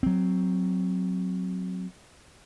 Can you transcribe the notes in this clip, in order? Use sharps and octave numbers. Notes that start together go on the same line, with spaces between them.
F#3 C4